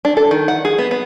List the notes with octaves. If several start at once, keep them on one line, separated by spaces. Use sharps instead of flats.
D4
A4
D#3
F#5
G#4
B3
B3